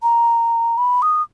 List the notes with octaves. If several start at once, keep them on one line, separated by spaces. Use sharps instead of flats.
A#5
B5
D#6